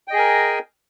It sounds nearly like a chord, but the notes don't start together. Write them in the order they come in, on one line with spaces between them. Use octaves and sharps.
G5 D#5 G#4 G#5 A#4